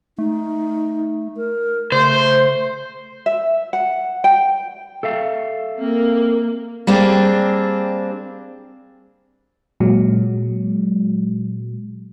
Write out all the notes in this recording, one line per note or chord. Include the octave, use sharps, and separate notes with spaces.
A3 D#4
A#4
C#3 A3 C5
E5
F#5
G5
A4 E5 F5
A#3 C4
G3 A#3 C4 D4 G#4
A#2 F#3 G#3